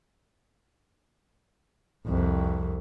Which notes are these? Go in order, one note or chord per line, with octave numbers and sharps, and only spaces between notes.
C2 F2